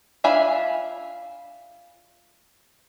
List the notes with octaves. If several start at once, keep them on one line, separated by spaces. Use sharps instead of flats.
D4 F4 E5 G#5 B5